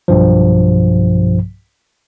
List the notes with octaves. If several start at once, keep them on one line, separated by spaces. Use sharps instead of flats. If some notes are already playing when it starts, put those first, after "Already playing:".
B1 G2 B2 F3